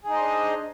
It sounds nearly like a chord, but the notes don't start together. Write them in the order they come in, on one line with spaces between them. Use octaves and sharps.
G#4 D#4 D#5 C5 D4